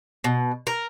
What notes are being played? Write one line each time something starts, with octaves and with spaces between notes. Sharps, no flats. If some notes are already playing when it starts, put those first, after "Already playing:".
B2
A#4